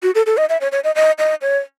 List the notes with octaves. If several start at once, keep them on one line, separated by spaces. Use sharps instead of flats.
F#4
A4
A4
D#5
E5
C#5
C#5
D#5
D#5
D#5
C#5